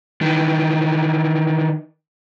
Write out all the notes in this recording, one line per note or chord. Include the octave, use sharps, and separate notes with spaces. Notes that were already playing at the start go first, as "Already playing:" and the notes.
D#3 E3